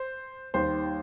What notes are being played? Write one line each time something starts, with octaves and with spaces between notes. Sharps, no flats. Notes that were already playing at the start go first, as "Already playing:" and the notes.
Already playing: C5
D#2 D#3 G3 C5